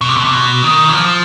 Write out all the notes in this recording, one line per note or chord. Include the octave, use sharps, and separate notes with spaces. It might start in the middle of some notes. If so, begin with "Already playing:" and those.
B2
C3
B2
C3
B2
D#3
E3
F3